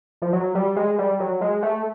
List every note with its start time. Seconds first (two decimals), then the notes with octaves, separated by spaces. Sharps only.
0.22 F3
0.33 F#3
0.55 G3
0.76 G#3
0.98 G3
1.20 F#3
1.41 G#3
1.63 A3